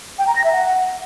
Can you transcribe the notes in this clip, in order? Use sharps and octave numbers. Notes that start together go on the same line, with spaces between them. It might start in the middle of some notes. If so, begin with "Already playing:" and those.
G5
A#5
A#6
E5
F#5